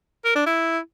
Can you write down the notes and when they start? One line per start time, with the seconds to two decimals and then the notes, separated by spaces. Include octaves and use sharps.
0.25 A#4
0.35 D4
0.46 E4